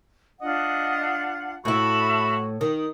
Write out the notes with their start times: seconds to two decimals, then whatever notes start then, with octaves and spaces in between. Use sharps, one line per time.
0.41 D4 F4 D#5 F#5
1.65 A2 E4 F#4 E5 A5 B5
2.61 D#3 D#6